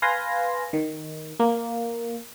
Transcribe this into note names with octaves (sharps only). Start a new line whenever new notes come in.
B4 F5 G#5 C6 A#6
D#3
A#3